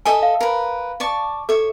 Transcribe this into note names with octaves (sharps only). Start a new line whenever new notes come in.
A4 D#5 E5 G#5
F5
A#4 B4
D5 A5 C#6
A4 C#5 E5